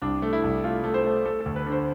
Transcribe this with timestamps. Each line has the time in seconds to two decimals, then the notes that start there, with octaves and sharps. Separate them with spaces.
0.02 C2 D4
0.22 A3
0.33 E4
0.44 C2
0.64 A3 F4
0.84 A3
0.94 C5
1.05 A3
1.25 A3 A4
1.40 A4
1.46 D2
1.56 B4
1.66 D3
1.72 C5